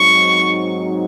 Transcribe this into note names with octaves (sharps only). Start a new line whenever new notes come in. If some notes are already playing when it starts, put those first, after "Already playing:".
Already playing: G#2 F#3 C4 D#4 C#6